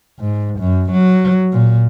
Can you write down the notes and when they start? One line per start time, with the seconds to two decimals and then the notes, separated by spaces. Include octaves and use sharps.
0.19 G#2
0.60 F#2
0.92 F#3
1.53 A#2